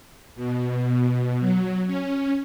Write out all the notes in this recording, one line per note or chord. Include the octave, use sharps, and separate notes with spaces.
B2
F#3
C#4